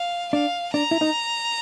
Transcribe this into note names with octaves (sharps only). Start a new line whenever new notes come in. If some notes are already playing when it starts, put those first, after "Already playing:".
Already playing: F5
D4 F5
D4 A#5
E4
D#4